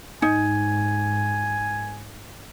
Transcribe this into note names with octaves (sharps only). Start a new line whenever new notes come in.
G#2 D#4 G#5